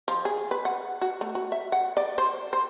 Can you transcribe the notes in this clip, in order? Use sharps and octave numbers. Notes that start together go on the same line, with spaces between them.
F3
G#4
B4
F#5
F#4
A3
F#4
E5
F#5
D5
C5
C5